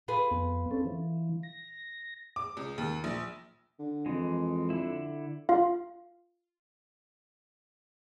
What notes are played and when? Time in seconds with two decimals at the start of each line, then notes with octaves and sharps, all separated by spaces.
0.08 F4 G#4 B4
0.31 F2 B3
0.71 C4 C#4 A4
0.85 E3
1.43 A#6
2.36 D6
2.57 C#2
2.78 D#2
3.04 A#1
3.79 D3
4.06 F2 E3 G#3
4.70 D3 E4
5.49 F4 F5